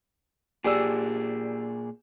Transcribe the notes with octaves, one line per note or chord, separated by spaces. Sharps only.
A#2 G4 G#4 D5 E6